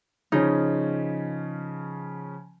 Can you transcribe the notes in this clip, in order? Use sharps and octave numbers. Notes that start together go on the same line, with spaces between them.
C#3 F3 C#4 D#4